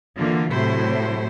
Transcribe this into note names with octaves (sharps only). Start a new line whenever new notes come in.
D3 E3 A#3 F4
A2 C3 F#3 E4 C5